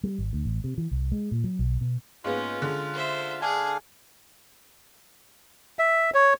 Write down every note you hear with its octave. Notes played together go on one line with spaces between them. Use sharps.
G3
G#1
D2
A1
C3
E3
C2
G#3
A#2
F#3
B1
B2
G#2 A#3 B3 C#4 F4
D3 G#3
C5 E5
D4 G#4 F5 G#5
E5
C#5